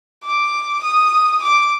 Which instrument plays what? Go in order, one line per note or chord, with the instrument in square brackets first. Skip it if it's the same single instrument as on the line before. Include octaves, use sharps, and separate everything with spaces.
[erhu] D6
D#6
D6